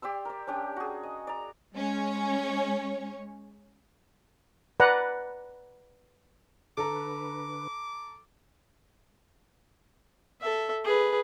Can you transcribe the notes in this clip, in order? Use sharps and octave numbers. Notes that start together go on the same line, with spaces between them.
G4 D5 C6 E6
A#4 D5
C#4 D4 G4 G5
F#4 G#4
D#5
D5 A#5
G#3 C#4 C#5
B4 D5 F#5 A#5
D3 A4 B4 A#5 D6
A4 E5
G#4 B4